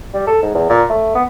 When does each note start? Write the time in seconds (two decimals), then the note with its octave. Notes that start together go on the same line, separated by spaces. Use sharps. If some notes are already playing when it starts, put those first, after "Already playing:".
0.14 G3
0.27 A4
0.42 G#2
0.55 E2
0.69 A#2
0.90 A3
1.15 B3